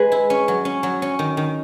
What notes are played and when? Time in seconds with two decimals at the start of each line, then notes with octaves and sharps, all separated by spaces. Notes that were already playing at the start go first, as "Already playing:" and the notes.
Already playing: G#3 G#4 B4
0.12 E4
0.30 C#4
0.48 F#3
0.65 C#4
0.83 F#3
1.02 C#4
1.19 D#3
1.37 D#3